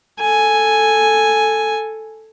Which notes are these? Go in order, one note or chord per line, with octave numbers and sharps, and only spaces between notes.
A4 G#5